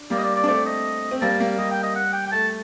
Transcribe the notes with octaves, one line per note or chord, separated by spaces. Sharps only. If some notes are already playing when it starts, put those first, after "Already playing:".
Already playing: D4
G3 A#3 D5
D#5
D5
D5
D4
A3 C4 D5
D#5
C4
G3 A#3 A5
G3 A#3
G3 D#5
G5
D#5
F#5
G5
G5
A3 A5